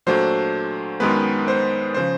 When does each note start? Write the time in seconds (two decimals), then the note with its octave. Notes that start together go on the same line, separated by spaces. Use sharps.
0.06 A#2 F#3 A3 D4 C5
1.00 F#2 D#3 G#3 B3 B4
1.48 C5
1.94 C#3 F3 C5